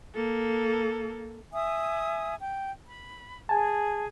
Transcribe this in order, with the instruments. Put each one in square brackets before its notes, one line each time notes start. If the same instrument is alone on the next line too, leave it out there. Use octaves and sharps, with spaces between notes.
[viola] A#3 A4
[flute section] E5 G#5 D#6
G5
B5
[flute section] G#4 [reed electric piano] G#5 A5